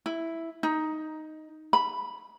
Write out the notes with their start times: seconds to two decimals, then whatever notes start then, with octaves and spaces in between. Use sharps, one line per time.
0.06 E4
0.63 D#4
1.73 B5